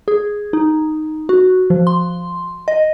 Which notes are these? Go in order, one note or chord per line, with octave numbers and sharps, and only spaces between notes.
G#4
D#4
F#4
F3
C6
D#5